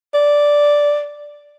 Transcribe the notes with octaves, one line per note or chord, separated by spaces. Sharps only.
D5